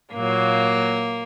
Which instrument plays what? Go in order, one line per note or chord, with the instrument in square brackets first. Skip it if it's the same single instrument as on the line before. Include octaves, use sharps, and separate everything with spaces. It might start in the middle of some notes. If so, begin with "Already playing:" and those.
[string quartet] A#2 F#3 A#3